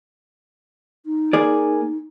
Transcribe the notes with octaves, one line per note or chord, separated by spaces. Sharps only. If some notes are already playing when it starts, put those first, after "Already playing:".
D#4
A#3 G#4 D5